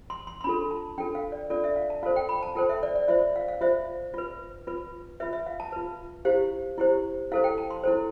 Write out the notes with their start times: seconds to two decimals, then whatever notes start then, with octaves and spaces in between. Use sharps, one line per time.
0.10 C6
0.27 C6
0.41 C6
0.44 D4 F4 A4 B5
0.71 A5
0.98 D4 F4 A4 G5
1.15 F5
1.32 D5
1.50 D4 F4 A4 D5
1.64 E5
1.76 F5
1.90 A5
2.03 F4 A4 C5 F5
2.16 G5
2.29 B5
2.43 A5
2.55 F4 A4 C5 G5
2.69 E5
2.83 D5
2.95 D5
3.08 F4 C5 E5
3.36 F5
3.48 F5
3.61 F4 C5 E5
4.14 F4 B4
4.67 F4 B4
5.20 F4 B4 E5
5.33 E5
5.46 F5
5.60 A5
5.72 F4 B4
6.25 E4 G4 C5 F5
6.78 E4 G4 C5
7.31 E4 A4 C5 F5
7.44 G5
7.58 A5
7.70 C6
7.84 E4 A4 C5